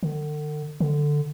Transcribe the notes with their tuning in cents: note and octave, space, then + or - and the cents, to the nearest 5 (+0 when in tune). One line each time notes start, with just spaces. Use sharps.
D3 +40
D3 +5